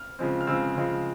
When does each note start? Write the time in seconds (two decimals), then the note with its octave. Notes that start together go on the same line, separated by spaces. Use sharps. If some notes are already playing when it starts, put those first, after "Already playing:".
Already playing: F6
0.19 C#3 F3 G#3 C4
0.41 F6
0.47 C#3 F3 G#3 C4 E6
0.76 C#3 F3 G#3 C4